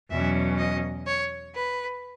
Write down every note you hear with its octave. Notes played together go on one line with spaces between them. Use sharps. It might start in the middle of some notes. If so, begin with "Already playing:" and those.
E2 B2 F#3 C#4 E5
D#5
C#5
B4